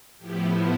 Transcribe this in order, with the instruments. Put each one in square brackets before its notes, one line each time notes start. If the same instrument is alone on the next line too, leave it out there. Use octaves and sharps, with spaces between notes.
[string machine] A2 F3 B3 E4 G4